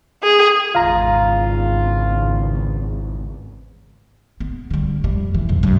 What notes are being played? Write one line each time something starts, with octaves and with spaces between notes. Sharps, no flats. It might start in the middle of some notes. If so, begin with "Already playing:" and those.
G#4
G#1 E2 C#3 F4 F5 A#5
B3
D3 G3
F2 G3
E3
B1 F2
B1 F#2